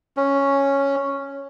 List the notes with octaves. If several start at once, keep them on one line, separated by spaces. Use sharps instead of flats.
C#4